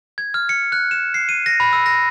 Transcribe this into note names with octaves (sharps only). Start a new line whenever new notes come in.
G#6
F6
C#7
F#6
E7
C7
D#7
A#6
B5
E6
A#6